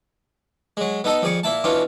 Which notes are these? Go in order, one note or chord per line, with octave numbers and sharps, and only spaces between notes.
F#3 G#3
B3 D#4 A4 D#5
F2 G#4 D5 C#6
A#2 E4 A5
B2 E3 C#4 D4 F4